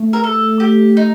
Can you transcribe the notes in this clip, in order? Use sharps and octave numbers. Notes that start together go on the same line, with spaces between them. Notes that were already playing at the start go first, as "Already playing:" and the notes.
Already playing: A3
A#4
A4
G4
D#4